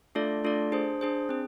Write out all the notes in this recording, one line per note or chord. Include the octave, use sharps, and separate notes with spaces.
A3 D4 F4 A4 D5
A3 D4 F4 A4 D5
D4 G#4 C5
D4 G#4 C5
C4 G#4